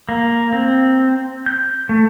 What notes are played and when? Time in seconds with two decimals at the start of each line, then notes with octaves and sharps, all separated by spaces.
0.09 A#3
0.53 C4
1.46 G6
1.89 A3